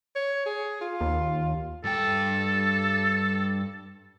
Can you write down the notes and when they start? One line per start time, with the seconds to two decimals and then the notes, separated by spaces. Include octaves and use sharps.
0.16 C#5
0.46 G#4
0.81 F4
1.01 D#2
1.85 G2 A4 G5